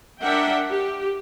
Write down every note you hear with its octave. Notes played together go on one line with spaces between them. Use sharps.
D4 A#4 E5 F#5 G5
G4